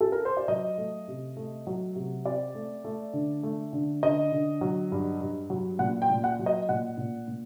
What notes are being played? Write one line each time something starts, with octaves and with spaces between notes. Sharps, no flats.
A4
A#4
C5
D5
F#3 D#5
A3
C3
A3
F#3
C3
C4 D5
A3
A3
D3
A3
D3
D3 D#5
D3
F#3
G2
G2
F#3
A#2 F#5
G5
A#2
F#5
F#3
D#5
A#2 F#5
A#2
A#2